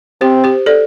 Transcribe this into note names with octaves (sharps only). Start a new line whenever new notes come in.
C4 G4 C5
G4 C5
A4 D5